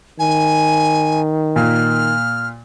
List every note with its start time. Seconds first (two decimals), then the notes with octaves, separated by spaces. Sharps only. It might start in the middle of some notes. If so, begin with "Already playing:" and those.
0.19 D#3 G#5
1.56 A#2 F6